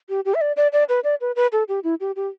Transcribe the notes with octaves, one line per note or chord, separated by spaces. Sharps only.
G4
G4
E5
D5
D5
D5
B4
D5
B4
B4
A4
G4
E4
G4
G4